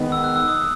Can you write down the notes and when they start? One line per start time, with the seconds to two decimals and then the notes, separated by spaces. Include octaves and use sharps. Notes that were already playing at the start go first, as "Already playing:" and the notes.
Already playing: D#3 G#3 B3
0.12 E6
0.24 F#6
0.36 E6
0.48 D#6